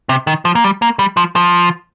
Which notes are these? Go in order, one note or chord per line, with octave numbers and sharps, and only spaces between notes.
C3
D#3
F3
A#3
G3
A#3
G3
F3
F3